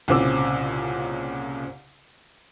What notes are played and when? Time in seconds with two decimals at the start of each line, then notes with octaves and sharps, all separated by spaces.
0.08 C2 A#2 C#3 C4 D6 E6